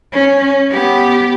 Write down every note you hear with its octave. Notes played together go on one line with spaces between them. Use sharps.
C#4
B3 G4